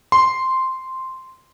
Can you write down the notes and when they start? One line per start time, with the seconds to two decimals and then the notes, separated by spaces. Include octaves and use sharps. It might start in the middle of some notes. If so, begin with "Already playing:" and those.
0.12 C6